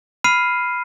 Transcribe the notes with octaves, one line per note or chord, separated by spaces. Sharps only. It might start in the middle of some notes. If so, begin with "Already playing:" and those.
B5 F6 C7 D#7